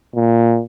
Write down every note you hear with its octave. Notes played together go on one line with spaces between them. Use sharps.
A#2